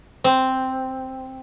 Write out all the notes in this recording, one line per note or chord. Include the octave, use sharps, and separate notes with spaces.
C4